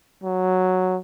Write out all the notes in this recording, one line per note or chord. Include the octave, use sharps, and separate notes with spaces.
F#3